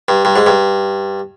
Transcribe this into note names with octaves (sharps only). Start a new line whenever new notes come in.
G2
G2
G#2
G2